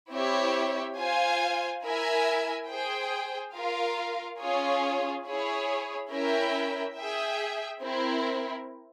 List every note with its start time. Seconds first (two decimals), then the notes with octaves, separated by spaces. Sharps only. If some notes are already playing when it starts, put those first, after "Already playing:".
0.11 C4 E4 G4 C#5 E5
0.97 F4 C5 F5 G#5
1.83 E4 A#4 E5 G#5
2.68 G#4 C5 G5
3.54 F4 A#4 F5
4.39 C#4 F4 G#4 C#5
5.25 E4 G#4 C#5
6.11 C#4 E4 A#4 E5 G5
6.97 G#4 E5 G5
7.82 C4 E4 A#4